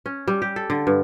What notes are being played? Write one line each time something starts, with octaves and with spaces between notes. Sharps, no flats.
C#4
G3
G4
A4
D3
G2